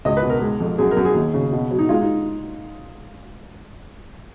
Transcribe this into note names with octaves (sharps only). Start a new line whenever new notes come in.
C#2 D#5
B4
B2
A#4
G#3
F2
F#2 G#4
A#4
F#2
G#4
D#2
C#3
B2
F#3
D#4
G#3 F4
D#4